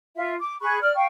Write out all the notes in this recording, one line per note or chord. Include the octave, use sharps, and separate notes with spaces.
F4 E5
D6
G#4 B5 C#6 F#6
D5 F6
F5 G5 C#6